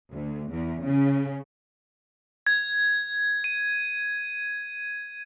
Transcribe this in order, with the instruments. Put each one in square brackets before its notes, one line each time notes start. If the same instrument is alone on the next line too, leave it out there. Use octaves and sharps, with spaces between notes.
[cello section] D2
E2
C#3
[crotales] G#6
D#7